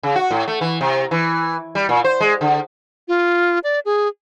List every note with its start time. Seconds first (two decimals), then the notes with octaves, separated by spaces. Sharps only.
0.03 C#3
0.16 F#4
0.31 A2
0.48 A3
0.61 E3
0.81 C3
1.11 E3
1.75 G3
1.89 A#2
2.04 C5
2.20 G#3
2.41 D3
3.08 F4
3.64 D5
3.85 G#4